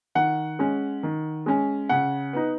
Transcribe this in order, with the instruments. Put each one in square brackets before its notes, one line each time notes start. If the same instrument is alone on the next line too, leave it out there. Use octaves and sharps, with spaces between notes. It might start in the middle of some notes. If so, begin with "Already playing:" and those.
[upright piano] D#3 F#5
G#3 C#4
D#3
G#3 C#4
C#3 F#5
B3 D#4